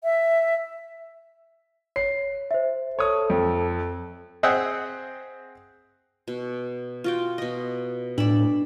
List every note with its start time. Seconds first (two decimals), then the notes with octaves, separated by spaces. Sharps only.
0.04 E5
1.96 C#5 C7
2.51 C5 E5
2.99 A4 C#5 D#6
3.30 F2
4.43 C4 G#4 D#5 E5 F#5 G5
6.28 B2
7.04 F4 F#4 G5
7.38 B2 D#5
8.18 A2 D4 D5 A5 B5